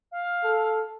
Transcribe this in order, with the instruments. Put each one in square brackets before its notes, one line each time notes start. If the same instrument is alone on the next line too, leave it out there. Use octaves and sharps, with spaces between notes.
[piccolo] F5
[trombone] A4